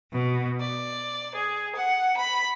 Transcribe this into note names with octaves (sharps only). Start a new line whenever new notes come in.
B2
D5
G#4
F#5
B5